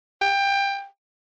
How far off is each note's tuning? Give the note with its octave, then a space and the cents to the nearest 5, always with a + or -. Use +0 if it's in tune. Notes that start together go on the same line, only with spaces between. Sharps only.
G5 +20